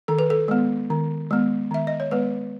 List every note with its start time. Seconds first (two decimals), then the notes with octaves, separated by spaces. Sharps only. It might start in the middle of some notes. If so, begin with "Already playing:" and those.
0.08 D#3 A4
0.19 B4
0.30 A4
0.48 G#3 B3
0.90 D#3
1.31 G#3 B3
1.71 D#3 E5
1.87 D#5
2.00 C#5
2.11 G#3 B3 B4